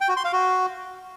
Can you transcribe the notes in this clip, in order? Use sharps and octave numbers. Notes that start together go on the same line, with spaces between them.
G5
F#4
C6
F5
F#4